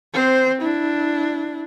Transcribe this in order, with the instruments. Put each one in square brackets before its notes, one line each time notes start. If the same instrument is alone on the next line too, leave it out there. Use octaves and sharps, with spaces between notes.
[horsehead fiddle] C4 C5
D4 E4